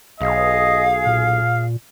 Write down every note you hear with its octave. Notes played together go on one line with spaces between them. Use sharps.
B1 G#4 D#5 F5
A#2 F6